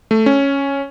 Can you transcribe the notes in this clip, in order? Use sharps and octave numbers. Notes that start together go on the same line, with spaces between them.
A3
C#4